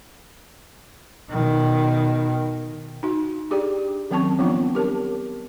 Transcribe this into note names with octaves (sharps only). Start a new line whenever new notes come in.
B2 D#3
D#4 F#4
D4 G4 G#4 D5 G5
D#3 F#3 C4 C#4 A5 C#6
F3 G3 B3 C4 D4 F4
G4 A#4 C#5 A5